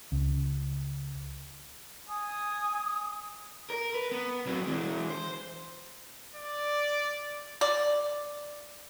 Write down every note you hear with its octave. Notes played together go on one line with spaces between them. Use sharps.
C#2
G#5 D#6
A#4
B4
B3
F#3 C4
E3 G#3
C5
D5
D5